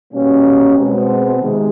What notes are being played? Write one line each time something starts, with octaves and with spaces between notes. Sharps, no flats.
B2 G3 A#3 C#4
B2 G#3 C4
C3 D#3 G#3